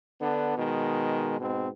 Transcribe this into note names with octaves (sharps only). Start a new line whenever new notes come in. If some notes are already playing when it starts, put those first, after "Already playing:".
D3 B3 D4
B2 D#3 G#3
G#2 B2 C4